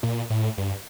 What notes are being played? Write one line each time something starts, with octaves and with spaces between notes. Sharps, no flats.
A#2
A2
G2